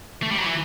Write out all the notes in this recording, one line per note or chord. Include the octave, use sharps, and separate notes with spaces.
A3
G3
F#3
E3